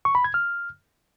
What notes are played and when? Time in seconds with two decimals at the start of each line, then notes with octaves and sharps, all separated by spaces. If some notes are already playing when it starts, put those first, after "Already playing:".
0.05 C#6
0.15 B5
0.24 G#6
0.34 F6